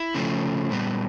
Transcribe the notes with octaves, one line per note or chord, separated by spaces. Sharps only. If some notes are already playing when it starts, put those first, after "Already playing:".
Already playing: E4
C#3 F3 A3 C#4
A#2 G3 B3